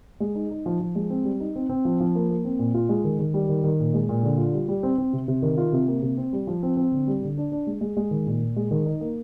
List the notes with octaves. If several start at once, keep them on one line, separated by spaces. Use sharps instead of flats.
G#3
D#4
D#4
F3
F3
G#3
C4
G3
D#4
C4
C4
F3
F3
A#3
A#3
C4
A#2
F4
G#3
D#3
D#3
G3
D#3
D#3
A#2
G#3
A#2
D3
F4
G3
G3
C4
C4
C3
C3
D#3
F4
C3
A#3
C3
C4
G3
F3
C4
C4
D3
G3
D3
D4
D4
G#3
G#3
G#3
D#3
A#2
A#2
G#3
D#3
D#4
A#3